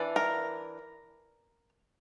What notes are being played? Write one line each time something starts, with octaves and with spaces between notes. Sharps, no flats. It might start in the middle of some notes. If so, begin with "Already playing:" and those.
Already playing: E3 D4
A#4